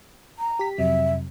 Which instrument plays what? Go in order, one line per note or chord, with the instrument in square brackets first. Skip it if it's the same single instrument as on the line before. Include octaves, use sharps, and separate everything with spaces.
[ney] A#5
[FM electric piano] G4 B6
[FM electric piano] F2 C3 F#3 [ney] E5